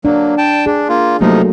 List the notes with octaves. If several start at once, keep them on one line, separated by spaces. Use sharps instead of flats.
F#3 A#3 D4
G5 A5
D4 G#4
A#3 F4
C3 F3 F#3 A3 A#3 D#4